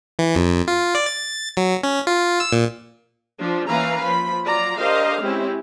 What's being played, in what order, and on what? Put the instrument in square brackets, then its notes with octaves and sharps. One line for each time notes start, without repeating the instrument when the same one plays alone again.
[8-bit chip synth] E3
F2
F4
D5
A6
F#3
C#4
F4
E6
A#2
[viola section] F3 D4
E3 A#3 C#4 B4 F5 A#5
F3 B5
F#3 F4 D5 A#5
D4 G4 A#4 C5 D#5 F5
G#3 C4 C#4 E4 G4